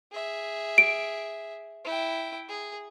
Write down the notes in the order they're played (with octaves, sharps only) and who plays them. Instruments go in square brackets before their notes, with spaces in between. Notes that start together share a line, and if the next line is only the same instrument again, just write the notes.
[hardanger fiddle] G#4 E5
[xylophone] D7
[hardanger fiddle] E4 G5
G#4